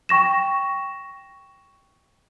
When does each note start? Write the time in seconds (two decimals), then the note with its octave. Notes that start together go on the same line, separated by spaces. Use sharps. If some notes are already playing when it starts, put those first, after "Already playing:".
0.09 G5 C#6 A#6 E7